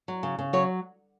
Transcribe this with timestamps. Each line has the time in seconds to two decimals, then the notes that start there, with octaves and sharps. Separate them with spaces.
0.08 F#3
0.23 C#3
0.38 C#3
0.53 F#3 C#5